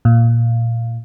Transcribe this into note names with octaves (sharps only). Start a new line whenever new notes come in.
A#2